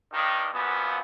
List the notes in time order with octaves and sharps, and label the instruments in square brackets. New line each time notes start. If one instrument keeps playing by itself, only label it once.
[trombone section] G2 D#3
F#2 A#2 F3 B3